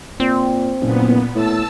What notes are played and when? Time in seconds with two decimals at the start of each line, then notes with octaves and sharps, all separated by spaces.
0.20 A#2 C4
0.81 F#1 A#2 B3
1.35 A2 A5 E6